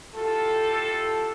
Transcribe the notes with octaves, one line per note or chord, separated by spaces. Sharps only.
E4 F4 G4 A4